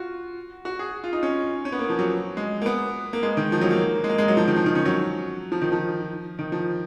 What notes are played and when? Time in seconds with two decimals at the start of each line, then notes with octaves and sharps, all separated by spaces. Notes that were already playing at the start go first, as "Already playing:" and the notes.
Already playing: F4 F#4
0.65 F#4
0.79 G#4
1.04 F4
1.13 D#4
1.23 C#4
1.65 C#4
1.72 B3
1.79 A#3
1.89 F3
1.99 F#3
2.37 G#3
2.62 A#3
2.66 B3
3.13 A#3
3.23 G#3
3.37 D#3
3.52 F3
3.61 F#3
3.71 A#3
4.04 G#3
4.09 A#3
4.18 G#3
4.28 F#3
4.37 F3
4.48 D#3
4.56 F3
4.66 D#3
4.75 C#4
4.85 F#3
5.52 F3
5.62 D#3
5.72 F3
6.39 D#3
6.52 F3